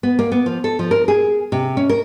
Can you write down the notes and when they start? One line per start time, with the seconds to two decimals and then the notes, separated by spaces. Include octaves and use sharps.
0.03 B3
0.19 A#3
0.32 B3
0.46 F3
0.64 A4
0.79 F3
0.91 A#4
1.08 G#4
1.52 C3
1.77 C#4
1.89 A#4